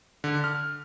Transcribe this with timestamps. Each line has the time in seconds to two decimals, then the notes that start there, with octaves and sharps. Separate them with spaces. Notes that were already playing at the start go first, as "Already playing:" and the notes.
0.24 D3
0.44 F6